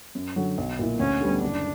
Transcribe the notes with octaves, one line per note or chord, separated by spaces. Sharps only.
F#2
D3 F#3
B1
A#2 A#3 E4
D2 C#4
D3 G3 B3
F#1 D4